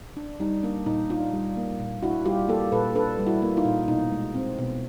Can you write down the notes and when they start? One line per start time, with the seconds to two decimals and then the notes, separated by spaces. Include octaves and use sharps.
0.17 D4
0.40 G3 D#4
0.63 A#3 D4
0.86 A#2 D#4
1.10 D4 D#4 F4
1.34 G3
1.57 A#3
1.80 A#2
2.03 D4 E4 F#4
2.25 G3 F4 G4
2.49 A#3 G4 A4
2.72 A#2 A4 B4
2.95 D4 A4 B4
3.19 G3
3.26 E4 F#4
3.42 A#3
3.57 D#4 F4
3.65 A#2
3.88 B2 D#4
4.12 G#3
4.34 C4
4.58 B2